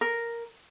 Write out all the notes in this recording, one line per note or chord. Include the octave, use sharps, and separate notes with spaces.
A#4